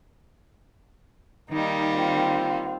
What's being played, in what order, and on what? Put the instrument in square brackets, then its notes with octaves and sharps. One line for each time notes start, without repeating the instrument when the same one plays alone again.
[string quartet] D#3 G3 A#3 [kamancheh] D#4
[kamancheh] C4 F4